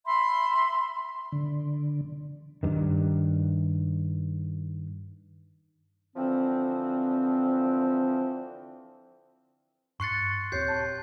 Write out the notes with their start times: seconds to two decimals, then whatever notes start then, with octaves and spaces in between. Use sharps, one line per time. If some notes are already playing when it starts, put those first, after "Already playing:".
0.05 E5 B5 C6
1.32 D3
2.63 G2 D#3
6.16 D3 E3 F3 C4
10.00 G2 C6 C#6 F#6 A6 C7 C#7
10.52 D#1 C4 G4 C#5 G6 C7
10.68 A5